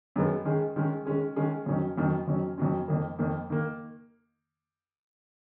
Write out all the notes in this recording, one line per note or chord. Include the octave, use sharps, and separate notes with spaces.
F#2 D#3 G#3 B3
D#3 G#3 C#4 G#4
D#3 G#3 C#4 G#4
D#3 G#3 C#4 G#4
D#3 G#3 C#4 G#4
F2 D#3 F#3 C#4
F2 D#3 F#3 C#4
F2 D#3 F#3 C#4
F2 D#3 F#3 C#4
F2 D#3 A#3
F2 D#3 A#3
D#3 A#3